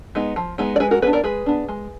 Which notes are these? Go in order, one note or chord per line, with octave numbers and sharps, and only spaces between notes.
G#3 B3 D#4
F3
G#3 B3 D#4
D5
G#3 G#4 B4
F#4 A#4
B3 D4 G#4 B4
A#4 D5
G#3 G#4 B4
B3 D4
G#3